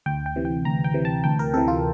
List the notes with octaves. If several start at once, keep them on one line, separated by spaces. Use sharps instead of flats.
D2 G5
G5
C3 E3
G5
D2 A#5
G5
C3 E3
A5
D2 G5
A#4
C3 E3 A4
F4